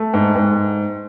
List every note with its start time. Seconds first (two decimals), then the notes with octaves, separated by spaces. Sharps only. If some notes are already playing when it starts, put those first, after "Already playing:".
Already playing: A3
0.13 G#2
0.35 G#2